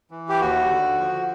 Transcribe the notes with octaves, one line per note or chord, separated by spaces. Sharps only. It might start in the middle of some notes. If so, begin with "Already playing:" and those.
E3
G4
D#2 F#4
D3
F3